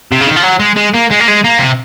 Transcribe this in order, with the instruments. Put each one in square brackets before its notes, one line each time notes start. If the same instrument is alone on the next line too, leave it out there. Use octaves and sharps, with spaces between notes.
[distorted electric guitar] C3
C#3
D#3
F3
F#3
G#3
G#3
A#3
G#3
A#3
G#3
A#3
C3